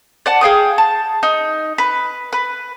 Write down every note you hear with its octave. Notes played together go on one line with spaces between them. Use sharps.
D5 F#5 A5
G#4 F5 G5 D#6
A5
D#4
B4
B4